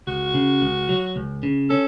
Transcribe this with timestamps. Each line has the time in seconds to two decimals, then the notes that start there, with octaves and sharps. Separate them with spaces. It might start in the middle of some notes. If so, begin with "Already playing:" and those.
0.07 C#2 F#4
0.34 C#3
0.61 C#2
0.89 F#3
1.16 C#2
1.43 C#3
1.70 C#4 A4